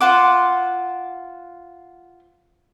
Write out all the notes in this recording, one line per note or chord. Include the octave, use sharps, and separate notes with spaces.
F4 C5 F#5 D6